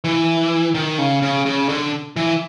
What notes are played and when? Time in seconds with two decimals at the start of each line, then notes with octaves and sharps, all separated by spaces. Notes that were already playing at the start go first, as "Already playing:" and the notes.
0.04 E3
0.75 D#3
0.98 C#3
1.22 C#3
1.46 C#3
1.69 D3
2.16 E3